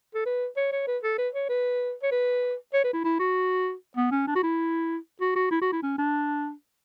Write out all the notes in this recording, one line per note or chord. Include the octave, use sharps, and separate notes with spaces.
A4
B4
C#5
C#5
B4
A4
B4
C#5
B4
C#5
B4
C#5
B4
E4
E4
F#4
B3
C#4
D4
F#4
E4
F#4
F#4
E4
F#4
E4
C#4
D4